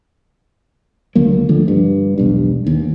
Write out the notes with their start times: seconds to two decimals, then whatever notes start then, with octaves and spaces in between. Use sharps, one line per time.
1.15 C#2 D3 F#3 A#3
1.49 D3 F3 A3
1.68 G2
2.18 E1 B1 G2
2.67 D#2